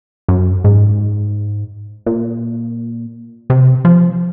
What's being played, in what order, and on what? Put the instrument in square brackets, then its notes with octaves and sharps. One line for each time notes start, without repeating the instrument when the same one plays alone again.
[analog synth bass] F#2
G#2
A#2
C3
F3